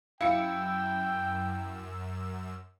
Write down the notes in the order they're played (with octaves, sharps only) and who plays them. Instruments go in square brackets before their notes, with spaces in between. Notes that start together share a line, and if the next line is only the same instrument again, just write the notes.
[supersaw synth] F#2 E6 [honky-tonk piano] E4 C#7 [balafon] F5 [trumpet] G5